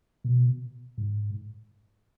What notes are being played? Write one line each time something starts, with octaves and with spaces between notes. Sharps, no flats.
B2
G#2